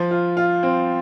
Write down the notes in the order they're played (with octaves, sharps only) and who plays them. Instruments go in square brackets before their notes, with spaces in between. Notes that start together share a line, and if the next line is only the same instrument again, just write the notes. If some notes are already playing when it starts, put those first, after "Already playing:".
Already playing: [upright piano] F3
F4
F4
C4